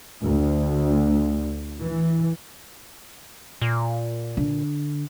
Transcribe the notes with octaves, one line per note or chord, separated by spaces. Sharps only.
D2
E3
A#2
D3